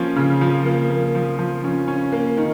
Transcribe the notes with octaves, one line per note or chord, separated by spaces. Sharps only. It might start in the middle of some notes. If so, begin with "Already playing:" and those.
Already playing: F3 A#3 C#4
C#3
F3
A#3
A#3
F3
F3
C#4
C#4
A#3
D#3